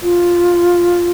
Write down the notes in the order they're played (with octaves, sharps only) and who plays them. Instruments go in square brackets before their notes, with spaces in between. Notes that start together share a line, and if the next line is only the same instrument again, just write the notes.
[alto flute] F4